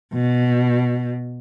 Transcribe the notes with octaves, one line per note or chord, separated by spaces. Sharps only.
B2